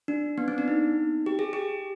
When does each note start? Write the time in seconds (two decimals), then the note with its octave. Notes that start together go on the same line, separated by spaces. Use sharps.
0.08 D4
0.38 B3
0.48 C4
0.58 D4
0.68 D#4
1.26 G4
1.39 G#4
1.53 G4